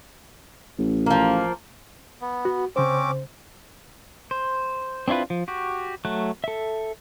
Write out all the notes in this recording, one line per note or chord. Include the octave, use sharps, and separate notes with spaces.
A1
F3 A#3
B3
F#4
C#3 C4 C#4 C5 D6
C5
C4 D4 E4 F4 B4
F3
F#4 G4
F#3 A3 F#6
A4 E5